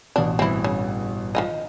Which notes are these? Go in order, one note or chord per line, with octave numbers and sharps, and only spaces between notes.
A1 B2 D4
G2 E3 C4 E4
C#3
D#3 F3 D#5